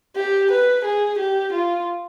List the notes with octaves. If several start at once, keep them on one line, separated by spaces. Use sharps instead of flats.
G4
B4
G#4
G4
F4